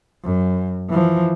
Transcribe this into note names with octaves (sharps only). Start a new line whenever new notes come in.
F#2
E3 F3